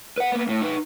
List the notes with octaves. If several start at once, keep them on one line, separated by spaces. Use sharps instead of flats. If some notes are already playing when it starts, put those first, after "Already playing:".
B4 F#5
A#3 B3
A2
D#4 B4